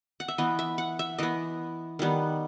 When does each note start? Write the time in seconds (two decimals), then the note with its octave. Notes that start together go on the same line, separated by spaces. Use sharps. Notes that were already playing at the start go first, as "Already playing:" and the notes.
0.20 F#5
0.28 E5
0.38 E3 B3 D#5
0.59 E5
0.78 F#5
0.99 E5
1.18 E3 B3 D#5
1.99 D#3 G3 B3